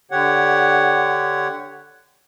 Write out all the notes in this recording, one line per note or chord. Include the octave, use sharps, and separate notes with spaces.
D3 G4 C#5 F#5